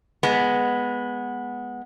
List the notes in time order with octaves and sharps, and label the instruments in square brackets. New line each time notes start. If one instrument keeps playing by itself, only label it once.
[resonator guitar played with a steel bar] G#3 B3